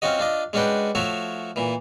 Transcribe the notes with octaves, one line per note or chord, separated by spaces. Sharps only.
C4 C#4 F4 F#4 D#5
D4 F4 D#5
G#3 C#4 D4 F#4 B4 G5
F3 A3 F#4 C#5 E5
A#2 E3